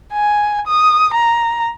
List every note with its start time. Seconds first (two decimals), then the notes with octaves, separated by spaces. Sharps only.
0.13 G#5
0.67 D#6
1.14 A#5